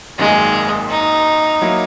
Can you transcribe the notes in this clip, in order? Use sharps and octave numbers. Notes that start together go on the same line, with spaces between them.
G#1 F#2 D#3 G#3 A#3
D#4
F#3 A#3 E4